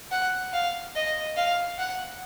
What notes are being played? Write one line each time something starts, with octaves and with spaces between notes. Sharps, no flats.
F#5
F5
D#5
F5
F#5